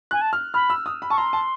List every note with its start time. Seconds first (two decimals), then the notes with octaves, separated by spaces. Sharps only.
0.11 G#5 F#6
0.21 A5
0.33 F6
0.54 B5 F6
0.70 E6
0.86 D#6
1.02 B5
1.10 A5 C#6
1.17 A#5 C6
1.33 A5